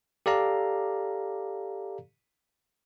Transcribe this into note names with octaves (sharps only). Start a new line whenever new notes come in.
G4 A4 D5 F5 A#5